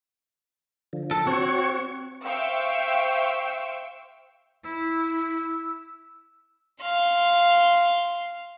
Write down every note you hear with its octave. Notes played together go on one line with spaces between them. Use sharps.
D3 F3
A4
C4 F#4 C#5 C#6
C5 E5 F5 G5 C#6 E6
E4 E6
F5 C6